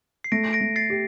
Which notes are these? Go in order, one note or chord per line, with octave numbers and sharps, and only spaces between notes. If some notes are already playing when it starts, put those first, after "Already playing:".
C7
A3 A#6 D7
A#6 D7
A3
A6 C7
G4